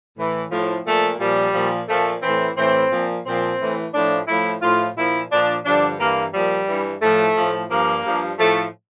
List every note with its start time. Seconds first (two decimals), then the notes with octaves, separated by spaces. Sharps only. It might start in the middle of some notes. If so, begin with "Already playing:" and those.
0.17 A2 E3
0.51 A2 F3
0.86 A#2 F3 A3
1.19 A#2 F3 G3
1.54 A#2 F3
1.88 A#2 F3 A3
2.22 A2 E3 C4
2.56 A2 E3 C4
2.91 A#2 F3
3.25 A#2 F3 C4
3.59 A2 E3
3.94 A2 F3 D4
4.28 A2 F3 E4
4.62 A2 F3 F4
4.96 A#2 F3 E4
5.31 A#2 F3 D4
5.65 G2 D3 F3 D4
5.99 G2 E3 A#3
6.33 A#2 F3 G3
6.68 G2 E3
7.02 A2 F3 A3
7.36 A2 F3
7.71 G2 F3 A#3
8.04 G2 F3
8.39 A2 F3 A3